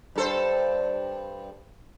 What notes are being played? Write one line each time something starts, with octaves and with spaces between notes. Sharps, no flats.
G2 A4 C5